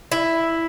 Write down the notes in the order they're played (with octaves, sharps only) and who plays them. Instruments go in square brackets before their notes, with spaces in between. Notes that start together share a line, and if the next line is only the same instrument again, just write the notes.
[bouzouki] E4